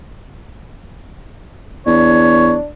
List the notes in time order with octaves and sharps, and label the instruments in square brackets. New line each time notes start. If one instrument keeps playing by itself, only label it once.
[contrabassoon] E2 [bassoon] D4 [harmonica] C#5